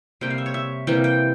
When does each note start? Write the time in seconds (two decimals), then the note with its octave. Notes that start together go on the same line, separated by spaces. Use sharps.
0.21 C3 G3 A#3 G5
0.30 F5
0.38 E5
0.46 C#5
0.54 E5
0.87 C3 E3 G3 A#3 G5
1.04 G5